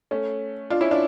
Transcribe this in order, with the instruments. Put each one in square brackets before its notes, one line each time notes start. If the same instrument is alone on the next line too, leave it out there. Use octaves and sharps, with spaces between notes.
[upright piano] A3 C#4
D4 F4
C#4 E4
D4 F4